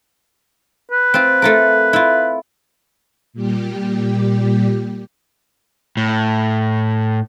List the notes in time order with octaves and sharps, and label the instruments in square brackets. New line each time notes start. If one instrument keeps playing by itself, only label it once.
[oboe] B4
[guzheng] C4 F4
A3 F4 A#4
E4 F4
[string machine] A#2 G3 G4
[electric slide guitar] A2